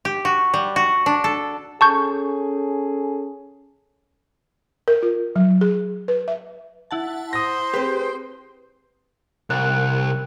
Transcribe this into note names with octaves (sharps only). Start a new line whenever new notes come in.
G4
F#4
G3
F#4
D4
A4
C#4 G#4 A4 A5 C#6 G6
A#4
F4
F#3
G#4
B4
E5
E4 F#5 A5
C5 D#6 A#6
C4 G4 G#4 B4
C2 A#4 F#6